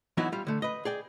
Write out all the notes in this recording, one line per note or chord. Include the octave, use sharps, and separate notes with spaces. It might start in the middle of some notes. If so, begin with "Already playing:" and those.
E3 F#3 B3 D#4 E4 F#4
G3 F4
D3 A3
B4 D#5
G#4 D5 G5